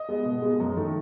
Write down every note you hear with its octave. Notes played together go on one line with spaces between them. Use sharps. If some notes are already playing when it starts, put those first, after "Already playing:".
Already playing: D#5
G#3 B3
B2
G#3 B3
F#2
D#3 A3